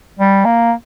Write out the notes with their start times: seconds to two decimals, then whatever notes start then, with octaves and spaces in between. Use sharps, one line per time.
0.19 G3
0.45 A#3